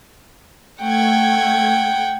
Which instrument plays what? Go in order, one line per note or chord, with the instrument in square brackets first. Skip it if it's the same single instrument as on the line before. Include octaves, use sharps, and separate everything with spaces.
[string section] A3 G#6 [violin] F#5 G5